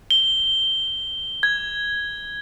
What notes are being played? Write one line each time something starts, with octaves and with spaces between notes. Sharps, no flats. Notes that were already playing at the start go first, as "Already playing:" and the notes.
G7
G#6